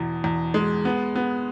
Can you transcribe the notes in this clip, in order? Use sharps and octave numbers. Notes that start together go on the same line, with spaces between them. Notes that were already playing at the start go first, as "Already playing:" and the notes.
Already playing: E2 B2
E2
G#3
B3
B3